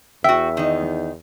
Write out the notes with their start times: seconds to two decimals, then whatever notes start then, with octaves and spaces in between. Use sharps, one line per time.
0.24 E2 F#4 E5 G5
0.57 D#3 D#4